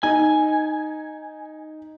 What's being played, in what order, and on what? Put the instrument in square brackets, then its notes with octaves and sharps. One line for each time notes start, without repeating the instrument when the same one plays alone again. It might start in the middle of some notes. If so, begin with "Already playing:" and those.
[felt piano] D#4 [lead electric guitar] G#5